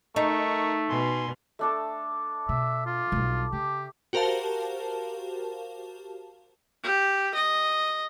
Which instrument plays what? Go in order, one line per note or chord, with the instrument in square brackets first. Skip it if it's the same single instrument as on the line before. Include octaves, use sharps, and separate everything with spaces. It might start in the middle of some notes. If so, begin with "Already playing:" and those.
[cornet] A3 [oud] D#4 [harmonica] A#4 C#6
[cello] B2 [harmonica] G#5 C6
[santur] A3 D4 A4
[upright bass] B2 [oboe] E5
[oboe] F4
[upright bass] B1 G3
[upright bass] C#3 [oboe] G4
[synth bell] F#4 G4 A#4 C5 F5 A5
[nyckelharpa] G4
D#5